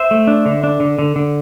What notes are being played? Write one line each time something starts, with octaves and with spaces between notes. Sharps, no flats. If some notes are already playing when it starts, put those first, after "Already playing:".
Already playing: C5 E5
A3
D4
D3
D4
D3
D3
D3